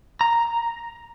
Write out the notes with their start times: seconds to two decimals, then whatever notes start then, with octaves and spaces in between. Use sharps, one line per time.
0.21 A#5